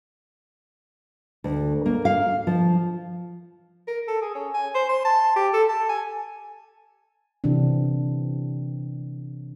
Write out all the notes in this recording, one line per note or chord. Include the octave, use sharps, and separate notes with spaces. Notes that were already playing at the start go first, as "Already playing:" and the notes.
D2
A#3
F5
F3
A#4
A4
G#4
C#4
G#5
C5
C6
A5
G4
A4
A5
G#5
C3 E3 C4 D4